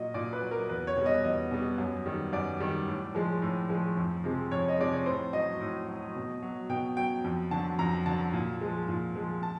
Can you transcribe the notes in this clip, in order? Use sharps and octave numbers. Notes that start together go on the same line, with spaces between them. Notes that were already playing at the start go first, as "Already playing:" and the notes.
Already playing: A#2 F#3 D#5
A#2 D5
B4
F#3
A#4
E2 B4
C#5
B2 G3
D#5
E2 D#5
B2 G3
F#2
D#3 G3
F#2 D5
D#3 G3
A2
F3 G#3
A2
F3 G#3
F2
C3 F3 G#3
F2 C#5
D#5
C3 F3 G#3 D5
C#5
A2 C5
F#3 D#5
A2
F#3
B2
F#3
B2 G5
F#3 G5
F2
D3 F#3 A5
F2 A#5
D3 F#3 A5
A#2
F3 G#3
A#2
F3 G#3
A5